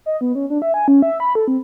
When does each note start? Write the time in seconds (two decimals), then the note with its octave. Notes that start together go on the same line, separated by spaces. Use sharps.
0.06 D#5
0.21 B3
0.35 C#4
0.50 D4
0.62 E5
0.74 G#5
0.88 C#4
1.02 E5
1.20 B5
1.35 A4
1.48 C4